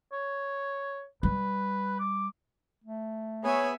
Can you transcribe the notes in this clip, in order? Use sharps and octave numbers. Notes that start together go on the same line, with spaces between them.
C#5
G3 B4
D6
A3
B3 G#4 B4 C#5 E5 G#5